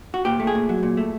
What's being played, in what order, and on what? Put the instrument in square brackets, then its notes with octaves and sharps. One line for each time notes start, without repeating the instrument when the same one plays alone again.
[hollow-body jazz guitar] F#4
A#2 G4
A3
G#4
A#2
F#3
A#2
A3